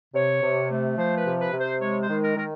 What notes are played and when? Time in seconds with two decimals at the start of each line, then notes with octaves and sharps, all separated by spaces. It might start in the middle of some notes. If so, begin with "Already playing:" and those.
0.14 C3 C#5
0.42 C3
0.70 A3
0.98 F3 C5
1.18 B4
1.25 C3
1.39 B4
1.53 C3
1.60 C5
1.80 G#3 C#5
2.01 C5
2.09 D#3
2.22 A#4
2.36 D#3 A#4